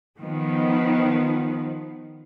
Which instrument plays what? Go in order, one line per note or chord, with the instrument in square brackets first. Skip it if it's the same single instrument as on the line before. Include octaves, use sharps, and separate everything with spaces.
[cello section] D#3 F3 B3